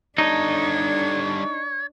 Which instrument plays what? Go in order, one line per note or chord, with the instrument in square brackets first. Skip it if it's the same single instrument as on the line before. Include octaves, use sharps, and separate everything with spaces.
[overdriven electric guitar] G3 A4 [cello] D4 [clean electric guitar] D#4 [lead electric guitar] C#5